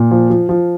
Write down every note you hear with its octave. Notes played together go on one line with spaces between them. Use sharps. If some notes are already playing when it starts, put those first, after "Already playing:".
Already playing: A#2
F3
F3
F3